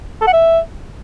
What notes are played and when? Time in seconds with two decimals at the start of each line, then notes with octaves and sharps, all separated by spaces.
0.21 A4
0.27 F#5
0.33 E5